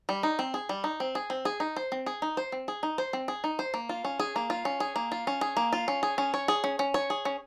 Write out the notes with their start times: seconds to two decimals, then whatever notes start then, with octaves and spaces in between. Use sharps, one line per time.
0.09 G3
0.23 D#4
0.39 C4
0.54 G#4
0.69 G3
0.84 D#4
1.00 C4
1.15 G#4
1.30 C4
1.45 G#4
1.60 D#4
1.77 C5
1.92 C4
2.06 G#4
2.22 D#4
2.37 C5
2.52 C4
2.68 G#4
2.83 D#4
2.98 C5
3.13 C4
3.28 G#4
3.44 D#4
3.59 C5
3.74 A#3
3.89 F4
4.05 C#4
4.20 G#4
4.36 A#3
4.50 F4
4.65 C#4
4.80 G#4
4.96 A#3
5.12 F4
5.27 C#4
5.41 G#4
5.57 A#3
5.73 F4
5.88 C#4
6.03 G#4
6.18 C#4
6.34 C#5
6.48 G#4
6.64 C#4
6.79 C#4
6.94 C#5
7.10 G#4
7.25 C#4